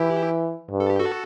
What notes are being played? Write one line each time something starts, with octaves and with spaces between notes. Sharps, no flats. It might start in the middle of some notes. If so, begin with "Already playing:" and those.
Already playing: E3 E4 G4
G2
A4
G4
F#4 A4